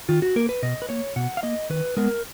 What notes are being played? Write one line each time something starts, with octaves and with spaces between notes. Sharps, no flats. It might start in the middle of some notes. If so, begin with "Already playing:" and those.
D#3 F4
F#4
A#3 A#4
B4
B2 D#5
B4
A#3 C#5
B2 F#5
F5
A#3 D#5
D#3 B4
G#3 B3 A#4